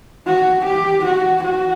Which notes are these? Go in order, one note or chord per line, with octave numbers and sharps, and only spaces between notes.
F#4
G4
F#4
F#4